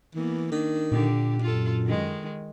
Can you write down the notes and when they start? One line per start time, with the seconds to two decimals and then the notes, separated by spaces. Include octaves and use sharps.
0.15 E3 A#3 B3
0.52 D#3 D4
0.92 A#2 D3 G4
1.42 F#2 F4 A4
1.86 D#3 G#3